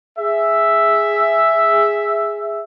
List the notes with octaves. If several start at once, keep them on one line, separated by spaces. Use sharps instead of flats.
G#4 E5